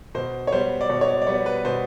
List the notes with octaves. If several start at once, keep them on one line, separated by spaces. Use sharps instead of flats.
B2 C5
C#5
G3 B3 C5
D5
B2 C#5
C#5
D5
D5
G3 B3 C#5
B4
B2 C5